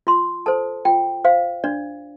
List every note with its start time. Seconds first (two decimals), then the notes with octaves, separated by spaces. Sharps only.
0.07 F4 C6
0.46 A4 C5 A5
0.85 F4 G5
1.24 C5 F5
1.64 D4 D5